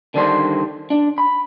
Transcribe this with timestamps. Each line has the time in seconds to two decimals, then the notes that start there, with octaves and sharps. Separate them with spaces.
0.14 D3 D#3 G3 D4 C5
0.90 D4
1.18 B5